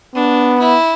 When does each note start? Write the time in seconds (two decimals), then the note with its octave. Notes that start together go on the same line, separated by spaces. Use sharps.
0.15 B3 D4
0.59 E4